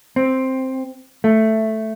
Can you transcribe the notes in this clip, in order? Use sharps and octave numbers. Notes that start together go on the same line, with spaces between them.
C4
A3